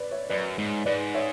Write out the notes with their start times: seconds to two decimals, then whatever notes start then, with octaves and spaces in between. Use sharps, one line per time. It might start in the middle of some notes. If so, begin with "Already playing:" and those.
Already playing: B4 D5
0.11 C#5 E5
0.30 F#2 B4 D5
0.58 G#2
0.86 G#2 B4 D5
1.15 C#5 E5